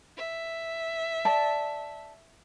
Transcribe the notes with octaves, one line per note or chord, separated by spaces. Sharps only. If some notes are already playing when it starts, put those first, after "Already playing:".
E5
D5 A5